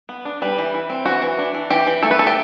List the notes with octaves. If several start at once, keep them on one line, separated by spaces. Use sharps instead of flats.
B3
D4
G3 B4
E3
E3
C4
E3 F#4
E3
D4
E3
E3 G4
E3
A3 A4
B4
A3 A4
G4